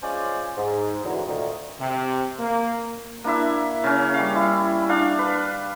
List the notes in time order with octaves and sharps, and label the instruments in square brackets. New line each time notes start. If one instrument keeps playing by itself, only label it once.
[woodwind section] G#3 C#4 F4 C5 D5 G#5
G#2
E2 A2 D3 E3 F#3
D2 A#2 D#3
[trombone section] C3
A#3
[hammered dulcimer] A#3 D4 E4 E5
C#3 C#4
G3 F5
E4
D4 F5
B4